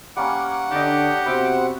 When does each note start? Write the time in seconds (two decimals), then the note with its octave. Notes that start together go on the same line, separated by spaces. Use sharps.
0.16 G3 A#3 C#4 F#5 D6
0.71 D3 D4 G4 D#5 A5
1.26 C3 B3 F#4 C5 E5